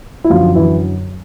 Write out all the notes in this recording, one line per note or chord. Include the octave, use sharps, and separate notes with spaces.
E4
F#2 D3 F3 F#3 F4
E3 E4